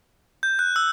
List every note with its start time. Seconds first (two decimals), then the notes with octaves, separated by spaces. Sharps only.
0.43 G6
0.59 F#6
0.76 E6